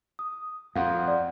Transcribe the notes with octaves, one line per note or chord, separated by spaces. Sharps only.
D#6
F2 F5 F#5
D5